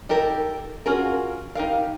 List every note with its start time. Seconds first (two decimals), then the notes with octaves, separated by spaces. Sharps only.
0.09 D#4 G4 A4 A#4
0.86 C#4 F4 F#4 G#4 A#4
1.55 D#4 G4 A#4 F5